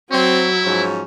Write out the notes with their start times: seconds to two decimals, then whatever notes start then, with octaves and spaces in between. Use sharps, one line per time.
0.11 F#3 C4 E4 C#5
0.65 G#2 F3 C#4